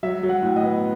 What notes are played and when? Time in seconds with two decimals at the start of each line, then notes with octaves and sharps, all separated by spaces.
0.03 F#3 E5
0.23 F#3
0.29 F#5
0.43 A2
0.56 D#5
0.63 B3